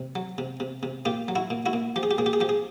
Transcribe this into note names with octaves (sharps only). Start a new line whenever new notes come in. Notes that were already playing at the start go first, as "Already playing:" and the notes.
Already playing: C3
F#3
C3
C3
C3
A#2 F4 G4
F#3
E4 F#4
A#2
E4 F#4
A#2
F3 G4
G#4
G4
A#2 G#4
G4
G#4
F3 G4
G#4